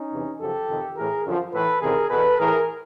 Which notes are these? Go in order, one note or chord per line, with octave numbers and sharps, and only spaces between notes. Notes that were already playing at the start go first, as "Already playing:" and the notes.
Already playing: C#4 D#4
E2 C3 E3
F#2 C#3 F3 G4 A4
F2 C3 D#3
A2 E3 G#4 A#4
F#2 D3 F3
A2 E3 A4 B4
E2 C3 D#3 G#4 A#4
E2 B2 A4 B4
A2 E3 G#4 A#4